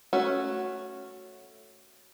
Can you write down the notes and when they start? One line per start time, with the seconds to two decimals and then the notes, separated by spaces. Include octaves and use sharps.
0.13 A3 C#4 F#4